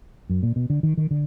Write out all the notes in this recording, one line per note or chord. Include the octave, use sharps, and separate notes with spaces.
F#2
A#2
B2
D3
D#3
D#3
D3